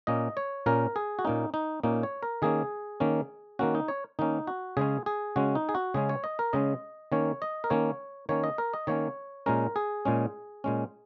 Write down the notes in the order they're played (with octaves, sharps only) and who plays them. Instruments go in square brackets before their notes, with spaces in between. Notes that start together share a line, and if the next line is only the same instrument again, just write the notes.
[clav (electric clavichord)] A#2 A#3 C#4 D#5
C#5
A#2 A#3 C#4 A#4
G#4
F#4
A#2 A#3 C#4 D#4
D#4
A#2 A#3 C#4 D#4
C#5
A#4
D#3 A#3 C#4 G#4
D#3 A#3 C#4
D#3 A#3 C#4 F#4
D#4
C#5
D#3 A#3 C#4 D#4
F#4
C#3 G#3 C#4 G#4
G#4
C#3 G#3 C#4 F#4
D#4
G#4
F#4
C#3 G#3 C#4 G#4
C#5
D#5
A#4
C#3 G#3 C#4 D#5
D#3 A#3 C#4 C#5
D#5
A#4
D#3 A#3 C#4 C#5
D#3 A#3 C#4 C#5
D#5
A#4
D#5
D#3 A#3 C#4 C#5
A#2 G#3 C#4 A#4
G#4
A#2 G#3 C#4
A#2 G#3 C#4